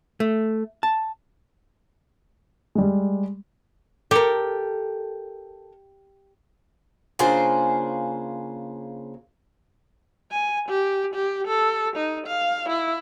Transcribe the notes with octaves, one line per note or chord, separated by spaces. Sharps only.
A3
A5
G3 G#3
G4 A4 A#4
C#3 A#3 D4 F4 G#4 C5
G#5
G4
G4
A4
D#4
F5
E4